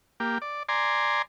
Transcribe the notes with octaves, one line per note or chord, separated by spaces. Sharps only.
A#3 G4
D5
D5 G#5 A#5 C6